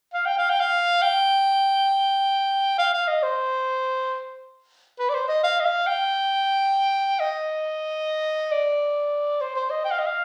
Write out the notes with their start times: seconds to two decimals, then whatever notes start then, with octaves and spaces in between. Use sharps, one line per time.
0.14 F5
0.26 G5
0.37 F5
0.49 G5
0.60 F5
1.02 G5
2.78 F5
2.93 F5
3.07 D#5
3.23 C5
4.99 B4
5.09 D5
5.14 C5
5.28 D#5
5.43 F5
5.60 D#5
5.65 F5
5.87 G5
7.20 D#5
8.52 D5
9.41 C5
9.55 C5
9.70 D#5
9.85 G5
9.91 F5
9.99 D#5
10.06 F5